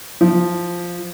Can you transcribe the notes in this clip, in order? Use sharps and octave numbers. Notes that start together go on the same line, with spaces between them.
F3